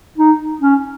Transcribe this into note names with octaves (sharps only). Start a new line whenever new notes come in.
D#4
C#4